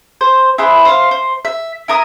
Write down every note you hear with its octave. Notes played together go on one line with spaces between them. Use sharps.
C5
E4 G#4 B4 C5
C5 F5
C5
E5
E4 A#4 D#6